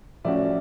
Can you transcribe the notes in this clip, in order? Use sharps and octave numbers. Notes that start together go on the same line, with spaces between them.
A2 F3 A3 C#4 F#4 D5 E5